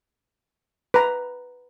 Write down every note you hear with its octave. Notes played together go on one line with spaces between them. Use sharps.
B4 A#5